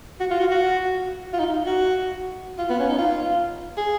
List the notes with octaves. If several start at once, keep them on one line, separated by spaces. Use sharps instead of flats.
F#4
F4
F#4
F#4
F4
D#4
F#4
F4
B3
C#4
D#4
F4
G#4